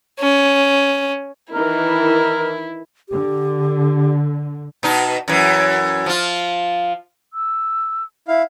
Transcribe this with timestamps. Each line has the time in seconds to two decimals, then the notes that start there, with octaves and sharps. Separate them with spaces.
0.19 C#4
1.54 D#3 E3 E4 A#4
3.09 D3 G4
4.83 B2 D#4
5.28 F#2 E3
6.06 F3 F4
7.33 E6
8.28 E4 F5